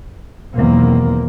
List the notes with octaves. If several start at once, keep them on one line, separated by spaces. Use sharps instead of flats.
B1 E2 D#3 A#3 C4